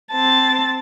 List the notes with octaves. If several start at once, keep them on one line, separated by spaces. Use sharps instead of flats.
C4 A5